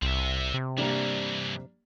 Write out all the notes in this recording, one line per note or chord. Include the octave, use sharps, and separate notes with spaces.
C2 C4 E5
C3
G2 E3 G3 A#3 D4